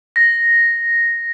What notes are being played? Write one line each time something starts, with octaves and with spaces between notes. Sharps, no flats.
A#6